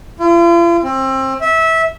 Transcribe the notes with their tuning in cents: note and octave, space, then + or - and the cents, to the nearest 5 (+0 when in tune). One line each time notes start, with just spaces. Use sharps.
F4 -45
C4 +25
E5 -20